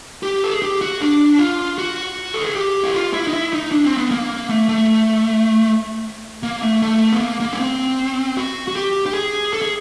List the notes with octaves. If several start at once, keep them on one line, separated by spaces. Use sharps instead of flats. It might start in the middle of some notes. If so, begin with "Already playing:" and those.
G4
A4
G#4
G4
F#4
D4
F4
F#4
A4
G#4
G4
E4
F4
E4
D#4
E4
D#4
D4
C4
B3
A#3
A3
A3
A#3
A3
A3
B3
A#3
A#3
C#4
C4
F#4
F#4
G4
G4
G#4
A4
G#4